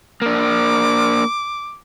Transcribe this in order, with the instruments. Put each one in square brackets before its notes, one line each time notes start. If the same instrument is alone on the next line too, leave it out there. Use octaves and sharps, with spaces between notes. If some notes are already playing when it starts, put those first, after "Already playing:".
[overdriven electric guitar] A#3 D4 [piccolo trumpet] D6